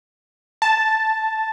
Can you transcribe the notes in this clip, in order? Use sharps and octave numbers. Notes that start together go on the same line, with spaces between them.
A5